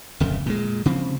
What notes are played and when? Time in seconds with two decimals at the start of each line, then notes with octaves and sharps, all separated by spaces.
0.20 D1 F2 C#3
0.46 A#2 G#3
0.86 C#3 F3 C4